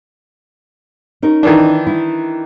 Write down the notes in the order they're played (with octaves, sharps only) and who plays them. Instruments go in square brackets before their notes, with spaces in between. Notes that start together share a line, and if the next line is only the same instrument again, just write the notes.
[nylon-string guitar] C#4 D#4 A#4
[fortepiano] D#3 E3 D4
[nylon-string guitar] E4